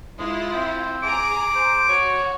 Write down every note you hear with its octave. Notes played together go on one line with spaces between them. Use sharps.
G#3 E4 F4
C4
G#4 A#5 D6
C5
F#4 C#5